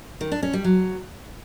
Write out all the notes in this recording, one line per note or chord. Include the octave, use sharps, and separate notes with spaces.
D#3
D4
C#4
G3
F#3